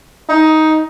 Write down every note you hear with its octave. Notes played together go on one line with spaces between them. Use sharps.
D#4